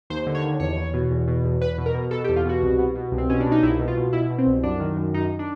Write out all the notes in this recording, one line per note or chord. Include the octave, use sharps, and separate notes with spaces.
D#2 C5
D3
C#5
D#2
E2 C#5
E2
B2
E2
B2
E2
E2 B4
B2
A#4
B2
B2 A4
G4
E2
F4
B2 F#4
C2
B2
B2
C2
C4
B2 C#4
D4
B2
D#4
C2 E4
B2
F4
B2
B2 E4
B2
C4
C2
F#2 D4
D#3
F#2
F#2 D#4
D4